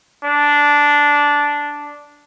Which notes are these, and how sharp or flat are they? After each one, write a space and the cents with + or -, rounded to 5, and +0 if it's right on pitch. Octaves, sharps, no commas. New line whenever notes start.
D4 -10